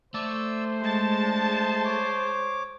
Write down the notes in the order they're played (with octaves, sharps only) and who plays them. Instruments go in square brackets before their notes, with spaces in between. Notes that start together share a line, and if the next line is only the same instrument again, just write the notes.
[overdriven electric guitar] A3 [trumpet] C5 [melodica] D5 E6
[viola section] G#3 A5 [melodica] C6
[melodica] D4
C#5 D6